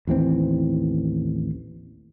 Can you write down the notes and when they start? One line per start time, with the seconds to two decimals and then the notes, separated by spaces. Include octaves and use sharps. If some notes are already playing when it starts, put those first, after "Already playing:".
0.07 A1 D#2 E3 C4